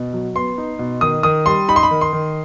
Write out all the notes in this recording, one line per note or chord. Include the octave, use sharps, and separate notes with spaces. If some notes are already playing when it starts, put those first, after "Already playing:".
Already playing: B2
F#3
B3 C6
D#4
B2
D#3 D#6
D#3 D#6
G3 C6
D#4 B5
C6
B5
D#3
C6
D#3